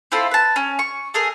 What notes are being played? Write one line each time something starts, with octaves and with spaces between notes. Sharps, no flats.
C4 E4 F4 A4
B4 A5
C#4
C#6
A3 G#4 A#4